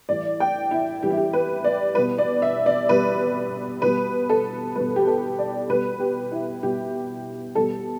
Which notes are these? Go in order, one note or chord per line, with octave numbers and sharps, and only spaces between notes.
A2 E3 G3 D5
G5
E4
A2 E3 G3 G4
E4
G4
B4
D5
B2 G3 B4
D5
E5
D5
B2 G3 B4
B2 G3 B4
A4
B2 G3 B4
G4
A4
D5
B2 G3 B4
G4
E4
B2 G3 G4
B2 G3 A4